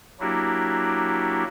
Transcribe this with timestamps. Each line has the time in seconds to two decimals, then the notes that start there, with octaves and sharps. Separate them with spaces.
0.20 F#3 A#3 D4 E4 F#4 G4